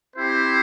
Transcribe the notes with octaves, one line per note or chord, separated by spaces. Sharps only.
C4 E4 G4 C5